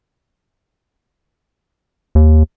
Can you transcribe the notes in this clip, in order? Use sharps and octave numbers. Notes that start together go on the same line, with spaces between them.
D#2